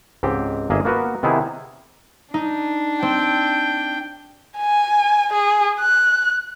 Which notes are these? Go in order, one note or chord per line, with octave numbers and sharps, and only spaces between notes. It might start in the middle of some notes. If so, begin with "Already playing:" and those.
C#2 G#2 C4 G4 G5
G1 A#3 G#4 D#5 E5
A#3 B3 F#4 A#4 B4
C3 D#3 B3 D#4 E4 G#4
D4 D#4
C4 G5
G#5
G#4
F#6